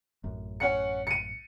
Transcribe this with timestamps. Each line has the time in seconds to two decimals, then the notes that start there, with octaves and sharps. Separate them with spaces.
0.24 A1 F#2
0.60 C#4 F#5 C#7
1.07 C#7 D#7